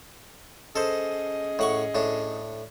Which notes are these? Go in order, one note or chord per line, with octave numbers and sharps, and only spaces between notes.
C#4 G#4 A4 C5 D#5
A2 F#5 C#6
A2 D4